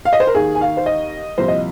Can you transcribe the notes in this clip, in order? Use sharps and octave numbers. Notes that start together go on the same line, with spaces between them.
F5
D#5
C5
A#4
D#2 D#3 G#4
G#5
F5
C5
D#5
C2 A#2 F3 C5
D#5